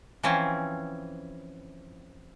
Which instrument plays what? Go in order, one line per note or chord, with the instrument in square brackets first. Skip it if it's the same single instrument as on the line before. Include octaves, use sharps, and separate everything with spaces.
[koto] E3 F3 C4 C#4